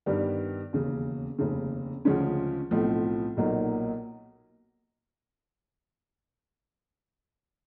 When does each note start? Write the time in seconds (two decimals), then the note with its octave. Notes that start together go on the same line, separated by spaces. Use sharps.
0.06 G2 D#3 G3 B3
0.73 E1 D#2 C#3
1.39 F1 D#2 C#3
2.05 D2 C#3 F3 G#3 C#4
2.71 B1 A2 F3 A3 C4
3.37 B1 A#2 F#3 A#3 D#4